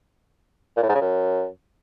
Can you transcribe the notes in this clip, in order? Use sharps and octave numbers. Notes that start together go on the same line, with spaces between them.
A#2
A2
G#2
C#3
F#2